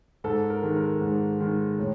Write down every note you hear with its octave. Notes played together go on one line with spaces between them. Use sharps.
G#2 A4
A#4
D#3 G#3
A#4
G#2
D#3 G#3
A2